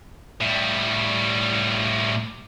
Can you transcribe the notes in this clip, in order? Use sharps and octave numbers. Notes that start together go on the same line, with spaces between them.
A2 G3